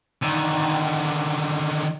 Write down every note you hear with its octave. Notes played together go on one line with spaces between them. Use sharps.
D3 D#3